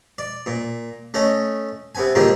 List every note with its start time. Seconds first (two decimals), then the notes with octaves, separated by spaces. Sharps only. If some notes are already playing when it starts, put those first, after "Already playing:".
0.18 D5
0.46 A#2
1.14 A3 C#4 D#5
1.95 C3 B3 G#5
2.15 G#2 D3 F3 G3 G#3 A#3